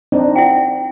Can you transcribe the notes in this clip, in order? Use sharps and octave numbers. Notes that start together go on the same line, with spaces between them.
C4 D4 D#4
E4 F#5 G5